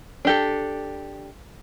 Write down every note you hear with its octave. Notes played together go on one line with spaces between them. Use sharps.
D4 G4 A4